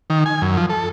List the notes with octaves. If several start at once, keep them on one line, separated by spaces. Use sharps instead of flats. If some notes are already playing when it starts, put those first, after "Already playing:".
D#3
G#5
F#2
F3
A4